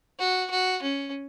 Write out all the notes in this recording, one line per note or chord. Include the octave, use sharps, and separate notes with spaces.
F#4
F#4
C#4